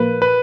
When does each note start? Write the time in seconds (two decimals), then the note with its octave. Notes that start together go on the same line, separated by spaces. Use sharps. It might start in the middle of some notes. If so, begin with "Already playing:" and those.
Already playing: A#2 F3 A#3 B4
0.22 B4